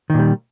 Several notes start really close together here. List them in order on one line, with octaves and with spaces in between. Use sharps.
D#3 A#2 G3